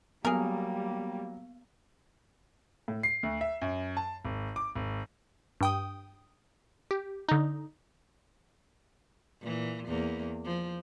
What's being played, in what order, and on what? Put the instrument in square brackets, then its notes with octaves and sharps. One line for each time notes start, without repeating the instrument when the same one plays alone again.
[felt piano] F#3 [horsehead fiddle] G3 A#3 [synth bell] B3 [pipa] G#4 A#4
[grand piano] A2
C7
D2
E5
F#2
A5
G#1
D6
G#1
[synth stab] G2 G5 D#6
G4
D3 D#4
[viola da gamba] A#2 E3
E2 A#3
F3